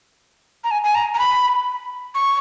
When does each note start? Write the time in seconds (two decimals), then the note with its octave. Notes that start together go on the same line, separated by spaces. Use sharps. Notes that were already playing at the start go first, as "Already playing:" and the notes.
0.64 A#5
0.71 G#5
0.84 G#5
0.95 A#5
1.14 A#5
1.19 B5
2.15 C#6